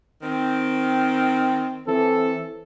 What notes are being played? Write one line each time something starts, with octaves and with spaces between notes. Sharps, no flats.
D#3 C4
E3 C4 A4